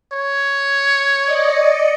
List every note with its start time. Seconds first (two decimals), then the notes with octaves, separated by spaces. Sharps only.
0.12 C#5
1.23 D5 D#5 C#7